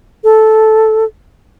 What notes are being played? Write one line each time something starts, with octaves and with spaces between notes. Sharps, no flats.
A4